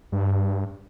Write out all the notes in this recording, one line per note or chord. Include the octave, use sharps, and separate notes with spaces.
G2